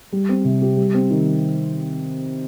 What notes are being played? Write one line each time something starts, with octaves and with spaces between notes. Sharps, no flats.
G3
C4
C3
G4
G3
C4
D#3